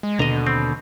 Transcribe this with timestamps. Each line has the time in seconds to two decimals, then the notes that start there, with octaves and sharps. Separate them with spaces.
0.03 G#3
0.19 D#2 B2 D3 D#5 A#5
0.47 C4